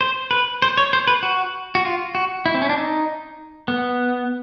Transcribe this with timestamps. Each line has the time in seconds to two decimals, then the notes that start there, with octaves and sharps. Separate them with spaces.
0.01 C5
0.31 B4
0.62 C5
0.77 C#5
0.93 C5
1.07 B4
1.23 F#4
1.75 F#4
1.85 F4
2.15 F#4
2.46 E4
2.54 C4
2.62 C#4
2.69 D4
2.77 D#4
3.68 B3